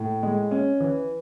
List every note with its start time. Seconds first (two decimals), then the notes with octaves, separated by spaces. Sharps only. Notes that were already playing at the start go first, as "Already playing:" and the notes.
Already playing: A2
0.23 G#3
0.51 C#4
0.80 E3